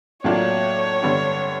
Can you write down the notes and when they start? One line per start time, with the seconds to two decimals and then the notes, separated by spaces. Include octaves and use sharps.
0.24 A2 F#3 A#3 D4 F4 C#5
1.02 G2 D3 G3 B3 D4